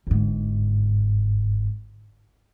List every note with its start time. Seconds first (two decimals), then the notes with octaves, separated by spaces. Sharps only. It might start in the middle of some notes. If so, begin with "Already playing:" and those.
0.07 G1 G#2